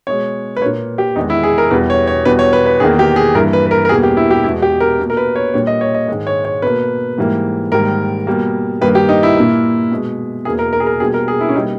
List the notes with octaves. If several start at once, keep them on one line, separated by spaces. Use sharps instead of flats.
B2 G#3 C#5
B4
A#2 A#3 C#5
G4
E2 D#3 G#3 D#4
E4
G#4
A#4
E2 B2 G3 B4
C#5
C#5
E2 B2 G3 B4
C#5
B4
B4
E2 D#3 A#3 G#4
G4
G#4
G2 E3 A#3 A#4
B4
B4
A#4
A#4
E2 B2 G3 A#3 G#4
G4
E4
G4
E2 B2 G#3 E4
G4
A#4
B2 A#3
A#4
B4
C#5
A#2 G3 A#3 C#5
D#5
C#5
D#5
G#2 D#3 G#3
C#5
C#5
B2 A#3 B4
G#2 E3 G3 A#3
G#2 D#3 G3 A#3 A#4
B2 G3 A#3
G2 D#3 G3 A#3 B4
G4
D#4
E4
A#2 A#3
B2 G#3
E2 B2 A#3 G#4
A#4
A#4
G#4
A#4
B2 G3 A#3 G#4
A#4
G#4
E4
C#4
B2 G3 A#3 D#4